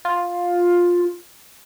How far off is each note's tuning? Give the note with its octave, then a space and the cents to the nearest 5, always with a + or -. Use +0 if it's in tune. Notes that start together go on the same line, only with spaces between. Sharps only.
F4 +10